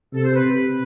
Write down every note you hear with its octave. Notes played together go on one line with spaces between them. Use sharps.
C3 A4
C5
B4
C3